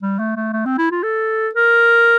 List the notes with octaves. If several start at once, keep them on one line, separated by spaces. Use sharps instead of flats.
G3
A3
A3
A3
C4
E4
F4
A4
A#4